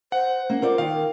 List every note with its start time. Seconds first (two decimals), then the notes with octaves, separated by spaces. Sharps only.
0.12 C5 F#5
0.50 A#3 C#4
0.62 F4 A#4 C5 D5
0.78 D#3 F5
0.92 A#4